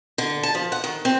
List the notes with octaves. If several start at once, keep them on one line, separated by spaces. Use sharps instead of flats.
D3
A5
F3
F#5
D#3
C4